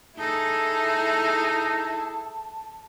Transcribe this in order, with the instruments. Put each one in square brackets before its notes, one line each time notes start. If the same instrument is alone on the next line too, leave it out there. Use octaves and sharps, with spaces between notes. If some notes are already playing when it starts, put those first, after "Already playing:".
[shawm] D#4 [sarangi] E4 [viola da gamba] G#4 A4 [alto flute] A5